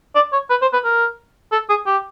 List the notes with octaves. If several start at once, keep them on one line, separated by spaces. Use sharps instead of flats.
D5
C#5
B4
C5
B4
A#4
A4
G#4
G4